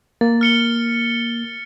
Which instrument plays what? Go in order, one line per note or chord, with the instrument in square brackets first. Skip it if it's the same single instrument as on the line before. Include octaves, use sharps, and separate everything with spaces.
[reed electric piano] A#3 [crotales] A6
[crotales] F6 C#7 G7